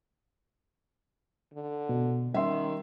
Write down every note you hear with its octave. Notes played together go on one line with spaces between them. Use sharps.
D3
B2
D#3 G3 C#4 E5 C6